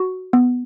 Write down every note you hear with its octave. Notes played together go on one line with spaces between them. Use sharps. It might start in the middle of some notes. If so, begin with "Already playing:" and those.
Already playing: F#4
B3